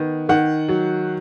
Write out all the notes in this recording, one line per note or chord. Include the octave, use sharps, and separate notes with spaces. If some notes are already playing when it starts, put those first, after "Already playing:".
Already playing: D#3 B3
D#3 F#5
F#3